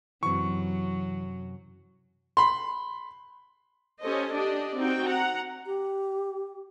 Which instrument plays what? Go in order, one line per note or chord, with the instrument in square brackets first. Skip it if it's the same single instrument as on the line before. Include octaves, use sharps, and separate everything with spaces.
[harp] F#2 C3 [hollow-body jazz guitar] E3 C4 [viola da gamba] F#3 [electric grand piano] C#6
[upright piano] B5 C6
[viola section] C#4 G4 A4 C5 D#5
D4 G4 D5 D#5
C4 D#4 F#4 G5
F#5 A#5
[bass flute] G4